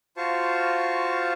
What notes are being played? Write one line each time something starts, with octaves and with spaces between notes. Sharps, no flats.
F4 F#4 C5 F5 A5 C#6